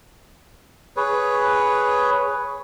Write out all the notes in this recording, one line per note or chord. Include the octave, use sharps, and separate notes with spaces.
G#4 B4 C#5